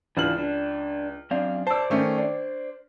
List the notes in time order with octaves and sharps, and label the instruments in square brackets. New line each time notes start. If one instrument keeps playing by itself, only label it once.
[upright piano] C#2 F6 F#7 [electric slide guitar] E3 D4 F4
[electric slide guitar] D4
[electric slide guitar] F#2 C4 F5 [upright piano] D4
[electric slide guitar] C5 D5 [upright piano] A5 E6
[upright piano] D#3 A3 C#4
D4